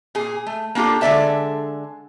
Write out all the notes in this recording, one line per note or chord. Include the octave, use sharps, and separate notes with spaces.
A#2 G#4
A3
A#3 D4 F4 G4 A4
D3 G#3 A4 D5 E5 A5